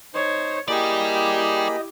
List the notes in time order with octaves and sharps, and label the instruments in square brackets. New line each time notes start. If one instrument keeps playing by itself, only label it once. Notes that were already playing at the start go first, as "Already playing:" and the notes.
[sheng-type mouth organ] D#4 C5 [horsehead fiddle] C#5
[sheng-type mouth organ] A#3 G#4 B5 [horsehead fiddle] E4 G4 [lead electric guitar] D5 G5 [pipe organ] D#5